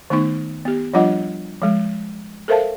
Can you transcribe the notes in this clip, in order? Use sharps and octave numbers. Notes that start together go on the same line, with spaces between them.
D#3 A3 B3 D#4 C#6
B3 G4
F3 G3 D4 F4 D#5 F#5
F3 G#3
A4 A#4 C5 E5 F5 A5